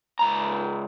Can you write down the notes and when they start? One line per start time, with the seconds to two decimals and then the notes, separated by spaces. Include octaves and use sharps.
0.19 C#2 A#5